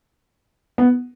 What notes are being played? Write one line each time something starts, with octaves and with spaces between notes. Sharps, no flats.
B3